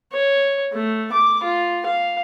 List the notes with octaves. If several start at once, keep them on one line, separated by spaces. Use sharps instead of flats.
C#5
A3
D6
F4
F5